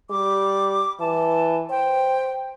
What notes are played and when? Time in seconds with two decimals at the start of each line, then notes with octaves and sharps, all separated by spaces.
0.10 G3 D6
1.00 E3 A5
1.70 C5 G5